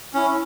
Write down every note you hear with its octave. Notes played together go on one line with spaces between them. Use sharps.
C#4 E4